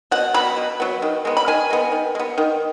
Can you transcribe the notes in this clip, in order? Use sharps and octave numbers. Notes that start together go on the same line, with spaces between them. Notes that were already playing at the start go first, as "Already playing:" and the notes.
B2 F#5
F#3 B3 B5
B2
F#3 B3
D#3
G#3 B3
B5
D#3 G#5
G#3 B3
D#3
G#3
B3
D#3